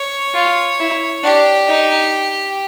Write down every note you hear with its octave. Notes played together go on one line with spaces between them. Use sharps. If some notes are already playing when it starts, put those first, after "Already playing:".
Already playing: C#5
F4
E4
D4 G4
D#4